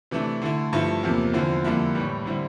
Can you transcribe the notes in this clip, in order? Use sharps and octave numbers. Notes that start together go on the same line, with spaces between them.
C3 E3 A3 D4
D3 A3 E4
G2 F3 A3 E4
E2 C3 F3 A#3
E2 D3 F3 C4 E4
F2 D3 G3 A#3 E4
A2 E3 G3
D3 G3 C4 E4